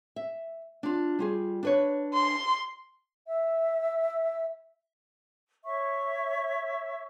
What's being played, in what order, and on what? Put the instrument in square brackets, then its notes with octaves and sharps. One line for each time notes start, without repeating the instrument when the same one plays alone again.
[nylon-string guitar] E5
D4 F4
G3 F4 G#4
D4 B4 C#5
[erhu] C6
[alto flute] E5
[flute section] C#5 E5 C#6